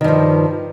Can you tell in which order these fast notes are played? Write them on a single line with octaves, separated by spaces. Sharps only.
D#3 G2 F3